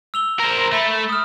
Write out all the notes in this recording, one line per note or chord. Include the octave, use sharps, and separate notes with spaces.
E6 F7 G7
A#4 C5
A3 B5 B6
D#6 F6